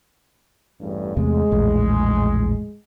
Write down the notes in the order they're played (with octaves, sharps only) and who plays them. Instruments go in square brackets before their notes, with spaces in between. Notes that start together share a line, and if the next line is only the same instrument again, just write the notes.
[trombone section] A1 E2 G2
[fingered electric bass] E2 C3 A3 [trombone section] G#3
[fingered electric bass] A#1 E2 A2